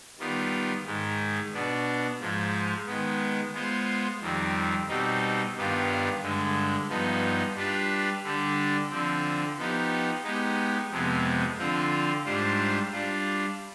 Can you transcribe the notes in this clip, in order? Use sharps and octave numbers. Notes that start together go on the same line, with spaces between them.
D#3 G3 B3 F4
G#2 D#3 G#3
B2 B3 D4
G#2 F3 G#3
D#3 G#3 B3
G#3 B3 F4 C5
F2 D#3 G3 C4
B2 G3 C4 D#4
G2 D#3 G3 B3 F4
G2 D3 G#3
G2 F3 B3 D#4
G3 D4 F4 B4
D3 G3 D4 G4
D3 F3 C4
F3 B3 D#4 G4
G#3 B3 D#4 G4
F2 C3 F3 G#3 B3
D3 F3 C4 F4
G#2 G3 D4 F4 C5
G3 D4 F4